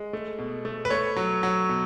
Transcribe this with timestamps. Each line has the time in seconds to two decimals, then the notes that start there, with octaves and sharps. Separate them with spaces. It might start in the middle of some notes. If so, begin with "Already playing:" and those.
Already playing: G#3
0.13 A3
0.38 B2
0.65 A3
0.85 B4
0.90 A3 C#5
1.16 F#3
1.43 F#3
1.69 B2